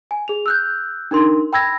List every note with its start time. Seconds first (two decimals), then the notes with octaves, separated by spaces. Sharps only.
0.11 G#5
0.28 G#4 F7
0.46 E6 F#6 G6
1.11 D4 D#4 A#4 C6
1.53 G5 B5 E6 G#6 A#6